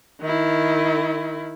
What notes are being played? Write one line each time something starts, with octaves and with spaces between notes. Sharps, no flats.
D#3 E4